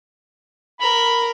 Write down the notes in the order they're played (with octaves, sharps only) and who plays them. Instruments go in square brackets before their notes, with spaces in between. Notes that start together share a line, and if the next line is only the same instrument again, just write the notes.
[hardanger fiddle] A#4 [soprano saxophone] B5